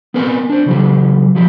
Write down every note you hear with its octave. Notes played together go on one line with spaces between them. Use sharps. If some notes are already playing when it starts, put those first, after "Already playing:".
B3 C4 A#4 B4 D5 G#5
D4 C5
C#3 E3 F#3 G4
F3 F#3 E4 G4